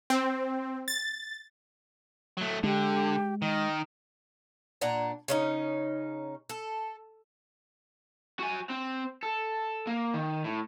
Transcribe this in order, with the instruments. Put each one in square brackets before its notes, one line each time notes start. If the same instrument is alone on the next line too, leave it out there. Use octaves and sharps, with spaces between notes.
[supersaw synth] C4
A6
[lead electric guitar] F#3 A3
[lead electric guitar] D3 [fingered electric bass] G#3 [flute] G4
[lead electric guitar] D#3 [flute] D#5
[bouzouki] A#2 D4 F#5 A#5
C#3 C#4 D#4
A4
[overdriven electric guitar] F#4 G#5
C4
A4
A#3
D#3
A2